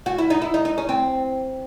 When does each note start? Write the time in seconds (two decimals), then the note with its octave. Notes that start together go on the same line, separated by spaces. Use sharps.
0.06 F#4
0.18 E4
0.30 D#4
0.42 E4
0.54 D#4
0.65 D#4
0.78 C#4
0.89 C4